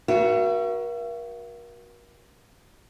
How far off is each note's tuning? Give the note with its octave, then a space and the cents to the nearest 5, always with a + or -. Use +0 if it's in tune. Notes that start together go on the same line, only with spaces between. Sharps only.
F#4 +0 A#4 +40 E5 +45